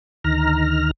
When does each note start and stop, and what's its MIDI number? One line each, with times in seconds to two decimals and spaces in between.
0.24 0.91 38
0.24 0.91 51
0.24 0.91 82
0.24 0.91 89